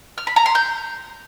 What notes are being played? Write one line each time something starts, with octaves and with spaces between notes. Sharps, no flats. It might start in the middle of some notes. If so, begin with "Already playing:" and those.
F6
B5
A#5
C6
G6